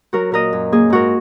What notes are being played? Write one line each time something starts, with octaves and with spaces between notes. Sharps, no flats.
F#3 F#4 A#4
A#2 A#4 D#5
F#2
A#3 G#4
G#2 F#4 A#4